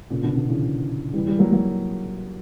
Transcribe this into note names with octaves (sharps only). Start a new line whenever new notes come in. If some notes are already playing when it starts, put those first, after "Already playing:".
A#2 C#3
B2 D3
B2 D3
C#3 E3
E3 G3
E3 G3
F#3 A#3
F#3 A#3